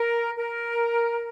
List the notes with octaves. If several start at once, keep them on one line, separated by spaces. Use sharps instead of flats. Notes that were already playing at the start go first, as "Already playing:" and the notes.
Already playing: A#4
A#4